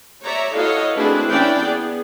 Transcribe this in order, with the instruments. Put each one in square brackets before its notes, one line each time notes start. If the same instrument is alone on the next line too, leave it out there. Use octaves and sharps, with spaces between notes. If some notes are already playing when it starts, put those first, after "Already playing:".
[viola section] C#5 D5 E5 A#5
E4 F#4 A4 C#5 D#5 F5
A3 C4 D4 E4 G#4 B4
E3 C#4 D4 E4 D5 G5
B3 G#4